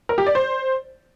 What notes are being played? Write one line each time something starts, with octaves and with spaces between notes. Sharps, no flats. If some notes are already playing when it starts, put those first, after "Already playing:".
A#4
G4
D5
C5